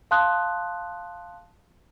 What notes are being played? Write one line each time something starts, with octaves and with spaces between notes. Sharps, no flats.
F5 A5 C6 D#6 F#6